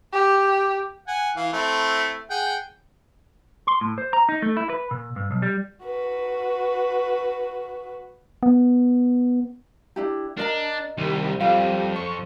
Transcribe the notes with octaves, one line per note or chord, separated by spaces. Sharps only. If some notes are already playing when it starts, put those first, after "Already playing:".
G4
F#5 G#5
E3 F5
A3 C4 E4
G#4 F#5 G5
C6
A2
C5
A#5
D#4
A3
E4
B4
A#2
G2
B1
G3
F#4 B4
B3
D4 E4 G4
D4 A#4 D#5 A#5
C2 D#3 G3
F2 G3 F4 F5
C5 C#6